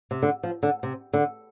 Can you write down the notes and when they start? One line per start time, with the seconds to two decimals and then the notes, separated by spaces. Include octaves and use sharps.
0.11 C3
0.23 D3
0.43 F3
0.63 D3
0.83 C3
1.13 D3